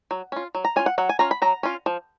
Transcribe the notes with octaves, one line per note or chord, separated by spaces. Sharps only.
F#3
C#4 F4
F#3
A#5
C#4 F4 G#5
F#5
F#3 F#5
G#5
C#4 F4 A#5
B5
F#3 A#5
C#4 F4
F3